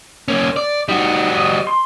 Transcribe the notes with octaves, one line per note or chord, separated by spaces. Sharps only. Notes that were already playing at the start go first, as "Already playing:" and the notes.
A#3 C#4
D5
G3 D#4 F#4
D#5
C6